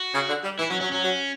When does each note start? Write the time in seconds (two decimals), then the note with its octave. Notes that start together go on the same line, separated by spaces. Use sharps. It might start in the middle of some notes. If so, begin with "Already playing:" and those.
Already playing: F#4
0.14 C#3
0.29 D3
0.44 G3
0.59 E3 E4
0.70 F#3 C#4
0.81 F#3 C#4
0.92 F#3 C#4
1.03 F#3